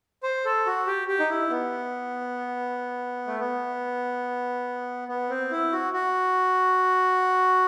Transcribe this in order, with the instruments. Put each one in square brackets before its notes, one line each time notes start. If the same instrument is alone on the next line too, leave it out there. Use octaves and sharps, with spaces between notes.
[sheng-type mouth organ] C5
A4
F#4
G4
G4
D#4
E4
B3
A3
B3
B3
C4
E4
F#4
F#4